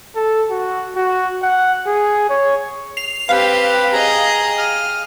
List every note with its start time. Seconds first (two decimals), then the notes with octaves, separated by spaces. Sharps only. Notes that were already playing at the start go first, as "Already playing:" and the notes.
0.16 A4
0.51 F#4
0.96 F#4
1.43 F#5
1.87 G#4
2.30 C#5
2.97 C7 F7
3.29 C4 G4 B4 F5 G5
3.93 G#4 D#5 A#5
4.58 D#6 F6